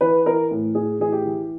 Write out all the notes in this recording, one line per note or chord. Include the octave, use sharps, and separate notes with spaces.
E3 B4
E3 A#4
A2
A2 G#4
E3 G#4
G4
E3